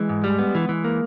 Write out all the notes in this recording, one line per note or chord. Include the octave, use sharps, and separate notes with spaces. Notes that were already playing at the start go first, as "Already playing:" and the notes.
Already playing: E3 G#3
G#2
G3
B3
E3
E3
A#3